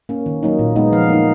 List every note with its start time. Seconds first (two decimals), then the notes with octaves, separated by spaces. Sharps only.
0.09 A#3 C#4
0.26 D#3
0.43 F#3 A#3 D#4
0.59 A#2
0.76 G#3 B3 D#4
0.92 F3 F5
1.09 A#3 D#4